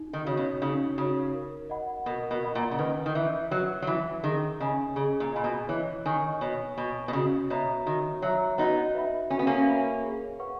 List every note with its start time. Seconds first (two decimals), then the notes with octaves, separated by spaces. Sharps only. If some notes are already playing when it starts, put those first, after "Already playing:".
Already playing: D#4
0.13 D#3
0.25 C#3 F#4 C#5
0.37 B2
0.62 C#3 D#4
0.98 C#3 F#4 C#5
1.34 A#4
1.70 D#5 F#5 B5
2.06 B2 A#4
2.31 B2
2.42 D#5 F#5 B5
2.55 A#2
2.71 C#3
2.79 D#3 B4
3.06 D#3
3.15 E3 E5 B5
3.51 F#3 B4
3.82 F#3
3.87 E3 E5 B5
4.23 D#3 G#4
4.60 C#3 D#5 G#5 B5
4.96 C#3 G#4
5.20 A#2
5.33 A#2 D#5 G#5 B5
5.44 B2
5.68 E3 C#5
6.06 D#3 G#5 C#6
6.41 B2 C#5
6.77 B2 G#5 C#6
7.08 B2
7.13 C#3 F#4
7.50 B2 C#5 E5 A#5
7.86 D#3 F#4
8.22 F#3 C#5 E5 A#5
8.58 B3 D#4 F#4
8.95 B4 E5 B5
9.30 C#4 F#4
9.39 B3
9.47 A#3 C#4
9.67 B4 E5 B5
10.04 G#4
10.40 B4 F#5 C#6